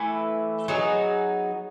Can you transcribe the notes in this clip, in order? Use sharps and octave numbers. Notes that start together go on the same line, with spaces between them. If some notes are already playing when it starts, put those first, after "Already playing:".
Already playing: E3 A3 E4 B4
F#3 B3 D#4 G#4